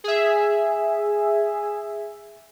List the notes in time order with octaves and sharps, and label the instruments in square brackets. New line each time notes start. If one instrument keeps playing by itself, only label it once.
[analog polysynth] G#4 E5